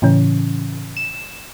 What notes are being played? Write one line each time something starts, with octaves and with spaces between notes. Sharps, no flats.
A2 C#3 E3 C#4
E7